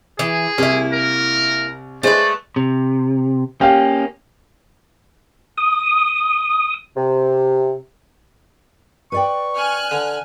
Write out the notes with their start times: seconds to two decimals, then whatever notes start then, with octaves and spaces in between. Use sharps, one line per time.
0.19 E3 G#4
0.58 C2 A#3 E4
0.92 A#4
2.03 G#3 A3 B4 C5 D5 D#5
2.56 C3
3.61 A#3 C#4 G4 F5
5.57 D#6
6.97 C3
9.12 B4 D5 G5 C#6
9.56 G#5 F6 F#6
9.91 D3